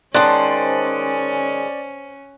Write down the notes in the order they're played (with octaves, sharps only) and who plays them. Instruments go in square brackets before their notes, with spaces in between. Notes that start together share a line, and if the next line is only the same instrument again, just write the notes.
[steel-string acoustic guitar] D#3 G#3 [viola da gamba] C#4 [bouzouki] C5 A5 [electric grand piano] D5 F#6